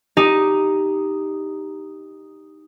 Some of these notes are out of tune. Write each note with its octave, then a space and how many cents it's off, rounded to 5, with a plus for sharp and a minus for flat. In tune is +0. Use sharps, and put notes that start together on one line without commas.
D#4 +0 G4 +0